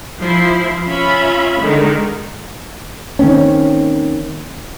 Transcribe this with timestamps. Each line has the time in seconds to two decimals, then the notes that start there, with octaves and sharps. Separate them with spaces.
0.20 F3 E4 C6
0.89 C#4 F4 E5 B5
1.59 D3 D#3 G#3
3.19 D#3 A#3 C4 C#4